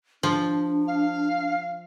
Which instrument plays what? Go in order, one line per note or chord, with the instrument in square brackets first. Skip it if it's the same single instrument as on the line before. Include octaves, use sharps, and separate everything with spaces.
[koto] F3 [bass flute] D4
[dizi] F5